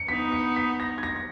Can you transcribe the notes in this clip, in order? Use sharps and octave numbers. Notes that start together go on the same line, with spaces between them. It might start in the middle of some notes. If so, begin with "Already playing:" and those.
Already playing: C#7
B3 D#4 B6
C#7
B6
A#6
G#6
A#6
A#6